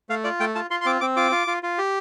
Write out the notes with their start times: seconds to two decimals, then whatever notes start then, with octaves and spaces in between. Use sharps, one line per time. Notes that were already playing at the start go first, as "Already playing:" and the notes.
0.09 A3 F5
0.24 F4 D5
0.40 A3 G5
0.55 F4 A5
0.71 F4 C6
0.81 C6
0.86 C4 D6
1.01 C4 D6
1.16 F4 D6
1.31 F4
1.47 F4
1.63 F4
1.78 G4